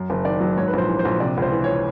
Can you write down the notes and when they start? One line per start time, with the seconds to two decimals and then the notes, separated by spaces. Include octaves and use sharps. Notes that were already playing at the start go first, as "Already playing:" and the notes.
Already playing: F#2
0.10 F#1
0.25 D#3 D5
0.40 F#3
0.57 G#2 C#5
0.68 B4
0.73 A#1
0.78 C5
0.89 E3
0.99 C5
1.05 A#1
1.20 C3 D5
1.37 C#2 C5
1.52 E3
1.64 C#5